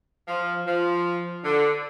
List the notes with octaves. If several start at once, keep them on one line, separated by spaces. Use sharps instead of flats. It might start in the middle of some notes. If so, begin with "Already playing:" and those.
F3
F3
D3